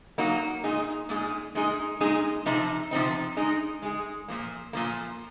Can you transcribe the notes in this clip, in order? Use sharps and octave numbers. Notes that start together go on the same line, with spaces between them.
F#3 A#3 D#4 F#4
A#2 G#3 D#4 G#4
A#2 G#3 D#4 G#4
A#2 G#3 D#4 G#4
A#2 G#3 D#4 G#4
C3 F3 C4 D#4
C3 F3 C4 D#4
G#3 D#4 G#4
G#3 D#4 G#4
A#2 F3 A#3
A#2 F3 A#3